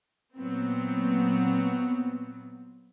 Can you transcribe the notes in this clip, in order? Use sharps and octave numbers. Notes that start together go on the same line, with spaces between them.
A#2 F#3 B3 C4